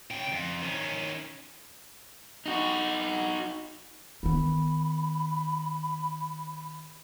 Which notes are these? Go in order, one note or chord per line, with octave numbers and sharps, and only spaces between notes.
C#3 G5
F2
D#3 C#4
D#4 F#4
D#3 B3 B5